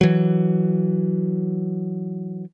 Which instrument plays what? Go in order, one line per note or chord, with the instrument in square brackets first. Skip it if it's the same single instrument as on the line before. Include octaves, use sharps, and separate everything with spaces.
[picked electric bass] E3 F#3